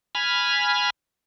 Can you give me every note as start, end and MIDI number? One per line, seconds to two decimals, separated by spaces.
0.15 0.90 80
0.15 0.90 83
0.15 0.90 89